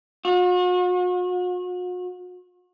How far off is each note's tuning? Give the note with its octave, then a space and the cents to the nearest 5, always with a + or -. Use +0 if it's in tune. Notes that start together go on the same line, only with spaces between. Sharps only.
F#4 -45